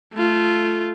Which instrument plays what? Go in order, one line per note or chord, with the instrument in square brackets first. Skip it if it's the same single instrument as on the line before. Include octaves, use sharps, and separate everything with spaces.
[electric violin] A3 F4